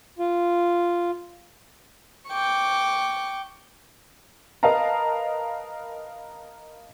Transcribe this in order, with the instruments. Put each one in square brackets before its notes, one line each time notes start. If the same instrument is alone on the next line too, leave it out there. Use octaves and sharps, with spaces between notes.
[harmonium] F4
[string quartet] G5 C#6 D6
[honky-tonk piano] A#4 B4 D#5 F5 A5 A#5